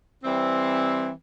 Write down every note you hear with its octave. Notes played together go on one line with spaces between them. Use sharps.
E3 G3 C4